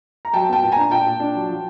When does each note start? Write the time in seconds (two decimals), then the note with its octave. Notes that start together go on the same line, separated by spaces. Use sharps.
0.25 A#5
0.33 F#3 G5 A5
0.49 B3 G5 A5
0.62 A#2
0.72 D4 G#5 A#5
0.91 A#2 G5 A5
1.06 A#2
1.20 D4
1.35 F#3
1.49 F3